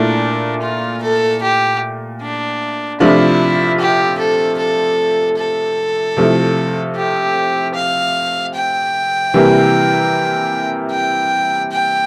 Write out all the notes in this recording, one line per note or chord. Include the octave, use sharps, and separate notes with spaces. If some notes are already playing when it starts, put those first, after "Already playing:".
Already playing: A#2 A3 D4 E4
F4
A4
G4
D4
C3 F3 A3 D4 E4 F4
G4
A4
A4
A4
C3 F3 A3 E4
G4
F5
G5
C3 E3 G3 A#3
G5
G5